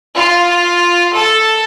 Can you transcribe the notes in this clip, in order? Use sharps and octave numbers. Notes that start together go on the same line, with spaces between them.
F4
A4